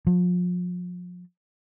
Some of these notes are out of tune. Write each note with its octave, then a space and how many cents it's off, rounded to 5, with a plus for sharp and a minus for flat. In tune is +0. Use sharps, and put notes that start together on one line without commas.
F3 +35